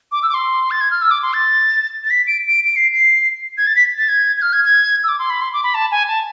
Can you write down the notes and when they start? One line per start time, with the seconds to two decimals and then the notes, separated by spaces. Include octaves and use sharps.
0.12 D6
0.23 E6
0.29 D6
0.34 C6
0.71 A6
0.81 G#6
0.91 F6
1.02 E6
1.11 D6
1.23 C6
1.33 A6
2.04 A6
2.10 B6
2.27 D7
2.47 D7
2.64 D7
2.76 C7
2.93 C7
3.58 G#6
3.67 A6
3.76 B6
3.98 A6
4.09 G#6
4.37 G#6
4.42 F6
4.53 G#6
4.64 G#6
5.04 E6
5.09 D6
5.19 C6
5.30 B5
5.41 C6
5.53 D6
5.63 B5
5.74 A5
5.92 G#5
6.08 A5